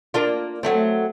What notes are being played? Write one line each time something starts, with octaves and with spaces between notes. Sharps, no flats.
A#3 D4 F4
F#3 A3 C4